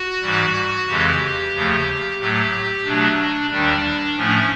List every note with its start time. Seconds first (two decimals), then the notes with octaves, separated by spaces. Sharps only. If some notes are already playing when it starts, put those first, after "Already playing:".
Already playing: F#4
0.22 G#2 E3 G3
0.87 F2 C#3 E3 G#3 G4
1.53 D#2 C#3 F3 A3
2.18 A2 F#3 A3 G4
2.84 B2 F#3 A3 D4
3.50 D#2 D#3 G3 D4
4.16 A2 F3 A3 C#4